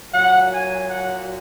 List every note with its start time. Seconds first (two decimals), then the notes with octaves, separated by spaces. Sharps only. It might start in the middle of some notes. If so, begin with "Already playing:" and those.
0.13 A#2 F#3 F#5
0.51 G#5
0.88 F#5